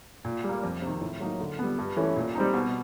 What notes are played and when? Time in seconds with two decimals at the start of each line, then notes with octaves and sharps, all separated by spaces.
0.25 A#2
0.44 G3
0.49 A#3
0.63 F2
0.82 C3 D#3
1.01 A2
1.20 F#3 A#3 D#4
1.40 D3
1.59 G3 B3
1.79 G2
1.97 E3 A3 C#4
2.16 A#2
2.35 G3 C4 D#4
2.54 B2